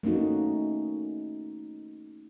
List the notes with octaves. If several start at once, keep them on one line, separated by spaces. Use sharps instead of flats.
A3 A#3 C#4 D#4 F#4